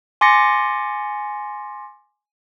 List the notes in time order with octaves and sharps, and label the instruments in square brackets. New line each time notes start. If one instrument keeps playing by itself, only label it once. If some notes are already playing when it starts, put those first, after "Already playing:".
[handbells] G#5 C6 D6 A6 A#6 C#7